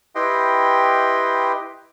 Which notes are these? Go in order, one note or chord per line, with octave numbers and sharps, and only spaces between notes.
E4 G4 B4 D#5 G5 C6